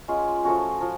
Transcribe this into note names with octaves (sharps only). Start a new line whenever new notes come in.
G#3 C#4 F4
F3 A3 C#4 F#4
F3